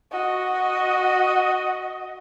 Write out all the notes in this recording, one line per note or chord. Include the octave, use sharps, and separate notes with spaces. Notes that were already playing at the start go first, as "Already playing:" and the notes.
F#4 D#5